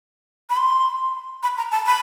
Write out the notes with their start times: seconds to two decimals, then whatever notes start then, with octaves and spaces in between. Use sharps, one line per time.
0.50 B5
0.57 C6
1.43 B5
1.57 A#5
1.71 A5
1.87 B5